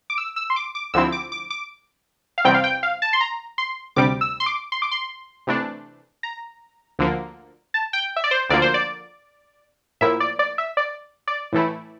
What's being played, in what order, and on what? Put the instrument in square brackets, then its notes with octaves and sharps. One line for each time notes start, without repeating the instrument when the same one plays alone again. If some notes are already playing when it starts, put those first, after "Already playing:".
[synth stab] D6
E6
E6
C6
D6
D6
D2 D3 F3 C4 E4 E6
D6
D6
D6
F5
E2 C3 G3 C4 G5
F5
G5
F5
A5
C6
A#5
C6
D2 C3 G3 D6
E6
C6
D6
C6
D6
C6
C3 E3 A3 D4
A#5
D2 D3 F3 A#3
A5
G5
E5
D5
C5
D2 D3 F3 A#3 D5
C5
D5
A2 F3 A#3 E4 E5
D5
D5
E5
D5
D5
A2 E3 A3 E4